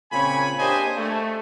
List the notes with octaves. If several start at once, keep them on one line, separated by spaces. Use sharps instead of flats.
A#2 C#3 C4 C#5 G#5 B5
A#3 D4 G4 C5 D#5 G#5
A3